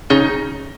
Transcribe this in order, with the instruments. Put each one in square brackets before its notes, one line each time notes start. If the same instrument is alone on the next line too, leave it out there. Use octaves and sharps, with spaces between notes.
[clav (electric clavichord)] C#3 [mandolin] D#4